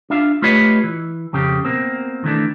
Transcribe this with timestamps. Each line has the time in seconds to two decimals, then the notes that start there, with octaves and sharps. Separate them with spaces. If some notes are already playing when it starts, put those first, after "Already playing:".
0.10 D4 F4 E5 F5
0.42 A3 F4 G4 B4 C#5 D#5
0.84 E3
1.33 F2 C#3 G4
1.65 B2 A#3 C4
2.24 D#3 E3 A3 D4